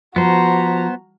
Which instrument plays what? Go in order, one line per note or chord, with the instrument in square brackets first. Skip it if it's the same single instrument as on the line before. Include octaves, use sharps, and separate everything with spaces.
[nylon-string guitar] F3 [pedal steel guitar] B3 C5 [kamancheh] F#4 A#5